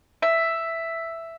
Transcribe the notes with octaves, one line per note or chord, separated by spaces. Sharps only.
E5